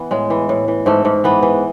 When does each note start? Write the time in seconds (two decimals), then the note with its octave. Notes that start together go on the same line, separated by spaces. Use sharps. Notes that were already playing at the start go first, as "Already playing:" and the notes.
Already playing: E3 B3
0.11 A2 G#3
0.30 E3
0.49 A2
0.68 E3
0.86 G#2 A3
1.05 G#2
1.24 E3 B3
1.42 E3